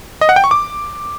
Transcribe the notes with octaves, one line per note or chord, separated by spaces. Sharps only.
D#5
F#5
G5
C#6
D6